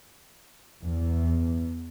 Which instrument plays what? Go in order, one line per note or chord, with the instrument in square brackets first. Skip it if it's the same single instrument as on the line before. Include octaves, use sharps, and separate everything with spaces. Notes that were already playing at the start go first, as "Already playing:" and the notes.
[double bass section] E2